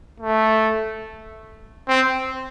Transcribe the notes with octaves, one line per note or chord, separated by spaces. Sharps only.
A3
C4